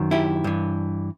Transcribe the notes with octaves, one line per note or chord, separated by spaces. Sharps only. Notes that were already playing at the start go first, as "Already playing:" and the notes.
Already playing: F#2 D#3
E4 G4
G2 E3